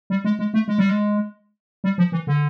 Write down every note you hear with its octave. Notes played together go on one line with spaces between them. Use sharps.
G3
G#3
G#3
A3
G#3
G3
G#3
G3
F3
E3
D3